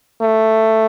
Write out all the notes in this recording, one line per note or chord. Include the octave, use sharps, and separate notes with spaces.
A3